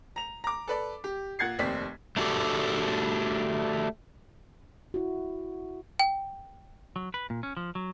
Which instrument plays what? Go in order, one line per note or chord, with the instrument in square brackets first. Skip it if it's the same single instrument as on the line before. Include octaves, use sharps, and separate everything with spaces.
[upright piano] A#5 F7
A#5 D6
A4 B4 D5
G4
A#2 F#5 G#6 A6 C7
F1 D#2 C4 D5 B6
[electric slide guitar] A3 D4 F#4 G4 A4
[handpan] E4 F#4
[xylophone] G5
[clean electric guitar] F#3
B4
A#2
C#4
F3
F#3